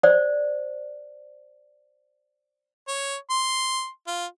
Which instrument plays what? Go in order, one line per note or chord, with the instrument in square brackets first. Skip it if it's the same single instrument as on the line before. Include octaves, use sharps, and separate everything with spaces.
[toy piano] C5 D5
[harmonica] C#5
C6
F4